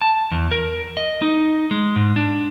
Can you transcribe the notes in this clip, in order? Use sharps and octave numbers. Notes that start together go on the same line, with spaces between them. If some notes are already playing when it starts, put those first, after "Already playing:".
A5
E2
A#4
D#5
D#4
G#3
G#2
D4